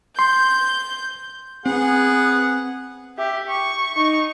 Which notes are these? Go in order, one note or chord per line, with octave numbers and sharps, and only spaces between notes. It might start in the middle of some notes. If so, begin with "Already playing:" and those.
C6 G6
B3 C4 G#4 F#5
G4 E5
C#6
D#4 C#6